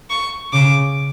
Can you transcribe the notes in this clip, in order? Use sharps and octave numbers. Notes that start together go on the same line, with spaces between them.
C#6
C#3 D6